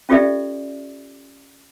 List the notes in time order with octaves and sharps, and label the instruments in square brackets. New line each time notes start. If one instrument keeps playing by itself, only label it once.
[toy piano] C#4 F4 G4 A4 D5 E5